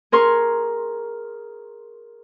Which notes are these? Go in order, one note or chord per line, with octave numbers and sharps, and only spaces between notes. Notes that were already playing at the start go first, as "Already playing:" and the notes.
G#4 A#4 C6 C#6